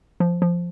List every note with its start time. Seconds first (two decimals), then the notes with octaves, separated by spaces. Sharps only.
0.20 F3
0.42 F3